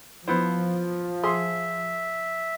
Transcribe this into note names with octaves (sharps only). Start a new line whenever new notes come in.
F3 B3 E4 C5
G#4 E5 C6 D#6